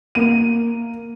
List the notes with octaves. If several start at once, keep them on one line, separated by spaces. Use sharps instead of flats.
A#3 D#7